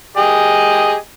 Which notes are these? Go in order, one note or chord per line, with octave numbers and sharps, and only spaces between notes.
G4 G#4 D#5